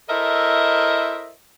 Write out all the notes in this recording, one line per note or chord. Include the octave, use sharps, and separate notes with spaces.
E4 A4 A#4 C5 D#5 E5